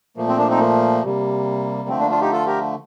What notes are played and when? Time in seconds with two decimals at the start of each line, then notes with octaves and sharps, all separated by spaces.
0.17 A#2 F3 A3 A#3
0.28 C4
0.38 A#3 D4
0.50 C4 D#4
0.60 A#3
1.04 C3 G3 A#3
1.89 D3 F3 A3 C4
2.00 A#3 D4
2.10 D4 F4
2.21 D#4 G4
2.32 F4 A4
2.46 G4 A#4